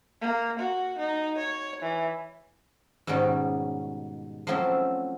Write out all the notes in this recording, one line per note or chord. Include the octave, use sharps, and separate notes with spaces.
A#3
F#4
D#4
C#5
E3
G#2 B2 D#3 G3 C#4
F3 F#3 A3 C4 C#4 E4